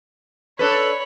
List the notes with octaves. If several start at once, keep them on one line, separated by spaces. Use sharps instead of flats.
D4 A4 B4 C#5 B5